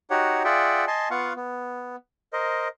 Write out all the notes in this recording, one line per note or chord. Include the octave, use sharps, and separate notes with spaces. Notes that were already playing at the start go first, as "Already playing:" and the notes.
D#4 F#4 G4 C#5 F#5
F4 G#4 D5 E5 F#5 G5
D#5 G#5 A5 C6
B3 F4 F5 F#5 C#6
B3
A#4 C5 D#5